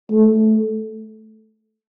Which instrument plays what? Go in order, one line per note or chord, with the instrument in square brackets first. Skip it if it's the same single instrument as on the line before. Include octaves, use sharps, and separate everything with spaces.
[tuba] A3